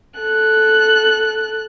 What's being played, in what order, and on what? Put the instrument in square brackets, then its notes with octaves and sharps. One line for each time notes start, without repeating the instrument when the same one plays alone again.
[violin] A4 F#6